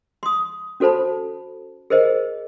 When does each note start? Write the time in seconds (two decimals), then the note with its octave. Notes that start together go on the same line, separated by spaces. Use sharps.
0.23 C6 D#6
0.80 C#4 F#4 A4 C5 A5 B5
1.90 G#4 A#4 C5 D#5